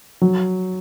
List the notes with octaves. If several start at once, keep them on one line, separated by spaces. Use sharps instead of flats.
F#3